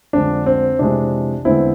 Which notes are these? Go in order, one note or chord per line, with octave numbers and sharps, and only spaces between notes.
F2 D3 G#3 D4
C4
F2 C3 E3 G#3 D4
E2 D3 G#3 C4 E4